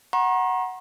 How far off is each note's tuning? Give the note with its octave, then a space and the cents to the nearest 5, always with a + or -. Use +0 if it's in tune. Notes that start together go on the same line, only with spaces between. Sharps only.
F#5 +0 A#5 +35 C#6 -40